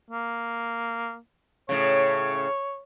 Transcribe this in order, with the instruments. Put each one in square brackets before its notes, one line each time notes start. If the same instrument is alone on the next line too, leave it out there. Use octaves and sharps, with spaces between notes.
[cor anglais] A#3
[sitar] A2 C#3 [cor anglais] C#5